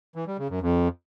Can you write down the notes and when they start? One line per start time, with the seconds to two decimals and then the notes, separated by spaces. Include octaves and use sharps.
0.15 E3
0.27 G3
0.38 C#3
0.50 F#2
0.61 F2